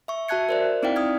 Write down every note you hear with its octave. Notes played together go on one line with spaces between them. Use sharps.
E5 C#6
F#4 E5 A5 F#6 G#6 C#7
A#4 C5 D5
C4 D#4 E4 D5 F5 G5
D#6 F6 G#6